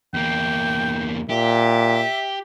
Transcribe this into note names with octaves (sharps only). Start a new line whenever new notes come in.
E2 A#3 G5
A#2 G4 E5